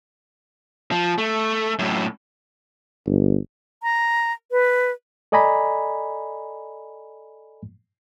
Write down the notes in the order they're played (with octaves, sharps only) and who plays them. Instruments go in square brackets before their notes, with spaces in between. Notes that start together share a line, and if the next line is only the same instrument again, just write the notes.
[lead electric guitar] F3
A3
F#2 A2
[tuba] G1
[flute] A#5
B4
[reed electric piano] A4 D5 D#5 G#5 A#5 B5